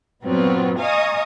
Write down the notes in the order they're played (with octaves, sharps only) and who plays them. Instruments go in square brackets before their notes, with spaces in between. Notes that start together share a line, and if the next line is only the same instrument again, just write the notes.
[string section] G2 A#2 F#3 B3 C4 F4
D#5 F5 G#5 A#5 C#6 D#6